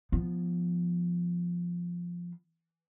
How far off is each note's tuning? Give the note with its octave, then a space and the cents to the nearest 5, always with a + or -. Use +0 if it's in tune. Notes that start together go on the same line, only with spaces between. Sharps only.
F3 +0 B3 +0